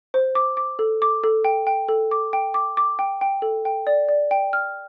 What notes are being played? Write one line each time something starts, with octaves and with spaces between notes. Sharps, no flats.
C5
D6
D6
A4
D6
A4
G5
G5
A4
D6
G5
D6
D6
G5
G5
A4
G5
D5
D5
G5
F6